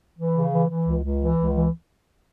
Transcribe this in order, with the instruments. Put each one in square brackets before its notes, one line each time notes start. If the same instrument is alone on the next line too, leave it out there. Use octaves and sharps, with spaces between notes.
[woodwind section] E3
C#3
E3
E3
C#2
C#2
E3
C#2
E3